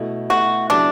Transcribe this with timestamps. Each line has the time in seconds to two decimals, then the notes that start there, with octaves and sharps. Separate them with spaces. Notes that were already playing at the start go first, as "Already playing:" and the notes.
Already playing: B2 A3 E4
0.30 B2 A3 E4 F#4
0.70 C#3 F#3 B3 D4 E4